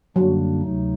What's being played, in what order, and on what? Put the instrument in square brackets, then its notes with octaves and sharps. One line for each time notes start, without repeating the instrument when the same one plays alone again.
[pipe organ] F#2 D3 G3 A#3 D4 [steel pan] F#3
[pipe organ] D2 C3 F#3 A3 D#4